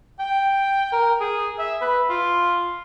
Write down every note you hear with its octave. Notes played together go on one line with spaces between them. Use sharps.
G5
A#4
G#4
E5
B4
F4